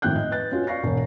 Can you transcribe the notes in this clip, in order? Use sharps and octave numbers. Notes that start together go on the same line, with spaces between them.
F2 A2 D#3 G5 F#6 G6
D#5
B4 F#6 A6
C#4 F4 F#4
D5 F5 C#6 A#6 C7
E1 C#5